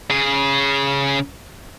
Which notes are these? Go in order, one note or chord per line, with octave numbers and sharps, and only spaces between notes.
C#3 G#4